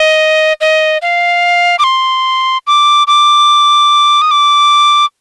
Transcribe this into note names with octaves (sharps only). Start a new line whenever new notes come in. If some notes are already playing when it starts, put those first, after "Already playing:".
Already playing: D#5
D#5
F5
D6
C6
D6
D6
D#6
D6